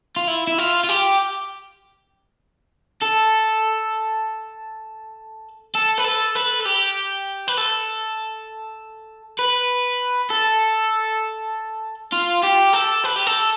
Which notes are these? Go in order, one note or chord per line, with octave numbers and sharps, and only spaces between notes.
F4
E4
E4
F4
F4
G4
A4
A4
B4
A4
B4
A4
G4
B4
A4
B4
A4
F4
G4
A4
B4
G4
A4